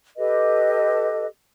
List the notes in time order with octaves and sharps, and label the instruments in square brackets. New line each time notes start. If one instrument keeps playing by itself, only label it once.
[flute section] G4 A4 B4 D#5